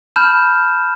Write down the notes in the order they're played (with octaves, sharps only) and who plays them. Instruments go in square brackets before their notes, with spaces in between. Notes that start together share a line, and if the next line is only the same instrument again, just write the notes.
[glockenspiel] A5 B5 F6 G6 E7